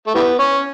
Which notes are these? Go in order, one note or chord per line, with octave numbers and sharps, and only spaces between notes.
A3
E3 G3 B3
C#4